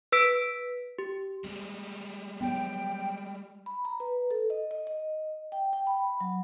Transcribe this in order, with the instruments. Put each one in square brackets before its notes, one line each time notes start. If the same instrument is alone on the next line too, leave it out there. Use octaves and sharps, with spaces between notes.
[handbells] B4 E6 B6 D7
G4
[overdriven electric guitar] G3 G#3 [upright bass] C4
[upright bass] F#3 B3 [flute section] G5
[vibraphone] B5
A#5
B4
A4
D#5
D#5
D#5
G5
G5
B5
F#3